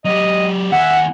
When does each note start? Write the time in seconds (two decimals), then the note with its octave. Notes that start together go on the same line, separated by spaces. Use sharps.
0.05 F#3 G4 D#5
0.72 D#2 E5 F#5 G#5